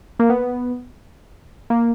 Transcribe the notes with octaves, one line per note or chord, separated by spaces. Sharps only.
A#3
B3
A#3